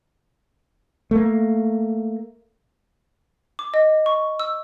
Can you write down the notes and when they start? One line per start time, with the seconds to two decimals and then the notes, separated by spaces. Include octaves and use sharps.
1.11 A3 A#3
3.59 D6
3.74 D#5
4.06 C#6
4.40 E6